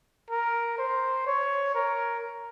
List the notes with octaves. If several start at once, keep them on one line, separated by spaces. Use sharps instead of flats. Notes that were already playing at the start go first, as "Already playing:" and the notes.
A#4
C5
C#5
A#4